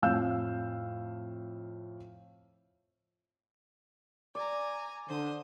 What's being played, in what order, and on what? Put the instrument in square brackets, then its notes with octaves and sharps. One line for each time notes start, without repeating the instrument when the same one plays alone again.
[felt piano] F2 A2 F5 E6 G6
[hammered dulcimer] D5 [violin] G#5 A#5
[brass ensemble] D3 [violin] C5 D#6